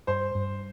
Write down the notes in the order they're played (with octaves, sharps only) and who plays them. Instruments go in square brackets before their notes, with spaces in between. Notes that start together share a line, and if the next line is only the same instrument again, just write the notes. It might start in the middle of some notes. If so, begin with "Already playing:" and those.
[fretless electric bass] G2 [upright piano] C5 C6
[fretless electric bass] G2